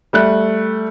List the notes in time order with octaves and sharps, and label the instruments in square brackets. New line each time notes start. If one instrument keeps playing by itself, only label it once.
[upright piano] G3 A3 F#6